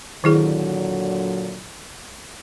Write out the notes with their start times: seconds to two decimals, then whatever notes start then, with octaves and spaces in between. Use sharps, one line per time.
0.24 A#2 D3 D#3 F#3 E4 G#4